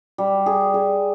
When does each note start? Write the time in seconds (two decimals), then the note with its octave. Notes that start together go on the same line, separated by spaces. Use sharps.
0.18 G3
0.46 G#4
0.74 G#4